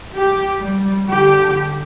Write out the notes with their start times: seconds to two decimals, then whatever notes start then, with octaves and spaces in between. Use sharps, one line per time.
0.16 G4
0.58 G3
1.09 D3 G4